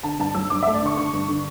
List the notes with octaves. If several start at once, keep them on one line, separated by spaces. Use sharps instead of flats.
D3 A5
G2 A5
F#3 E6
G2 D6
E5
A3
D5
D3 C#6
D3 C#6
G2
D3